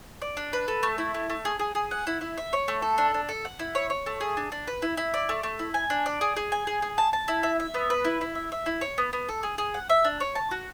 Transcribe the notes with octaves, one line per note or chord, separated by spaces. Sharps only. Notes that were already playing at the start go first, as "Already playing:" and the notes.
D5
D4
B4
A4
A3
E4
A3
A3
G#4
G#4
G#4
F#5
E4
E4
E5
C#5
A3
A4
D4
D4
A4
F#5
E4
C#5
C#5
A3
G#4
D4
D4
B4
E4
E4
D5
A3
A3
E4
G#5
D4
D5
G#4
G#4
G#5
G#4
G#4
A5
A5
E4
E5
E5
B3
B4
E4
E4
E5
E5
E4
C#5
B3
B3
A4
G#4
G#4
F#5
E5
D4
C#5
A5
F#4